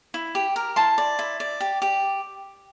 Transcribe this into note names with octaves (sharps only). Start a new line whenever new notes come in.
E4
G4
A#4
E4 A5 C6
D5
E4
D5
G4
G4